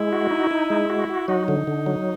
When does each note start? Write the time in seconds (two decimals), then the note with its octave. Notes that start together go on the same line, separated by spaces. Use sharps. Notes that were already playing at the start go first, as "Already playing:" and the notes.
Already playing: G#3 E4
0.13 F#4
0.31 D#4
0.51 D#4
0.70 G#3
0.90 F#4
1.09 F#4
1.28 F#3 D#4
1.48 D3
1.67 D3
1.86 F#3